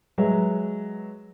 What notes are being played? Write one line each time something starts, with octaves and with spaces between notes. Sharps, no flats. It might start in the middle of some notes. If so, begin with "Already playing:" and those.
F#3 G#3 G#4 B4 E5